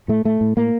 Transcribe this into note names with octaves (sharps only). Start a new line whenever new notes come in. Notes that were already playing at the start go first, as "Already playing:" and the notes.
A2 A3
A2 A3
A2
A2 A#3